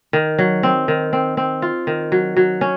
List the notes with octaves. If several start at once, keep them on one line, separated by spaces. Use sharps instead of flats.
D#3
F#3
C4
D#3
C4
C4
F4
D#3
F#3
F#3
C#4